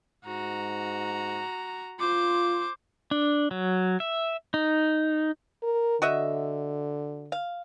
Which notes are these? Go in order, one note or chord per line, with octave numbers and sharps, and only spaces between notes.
G#2 F#4 A#5
F4 C5 D6
D4
F#3
E5
D#4
A#4
D3 F#4 D#5 E5
F5